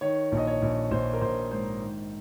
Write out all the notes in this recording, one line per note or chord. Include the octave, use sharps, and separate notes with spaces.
D#3 C#5
A#1
D#5
C#5
A#1
A#1 C5
A#4
A#1 C5
G#2 C5
D#3